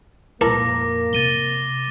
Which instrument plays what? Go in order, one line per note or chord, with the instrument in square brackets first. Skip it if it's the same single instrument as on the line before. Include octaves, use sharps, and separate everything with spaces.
[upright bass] F2 A#2 [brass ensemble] A#3 [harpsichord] E4 A#4 A5 [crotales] D6 A#6
[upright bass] C3 [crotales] A6 D#7 G7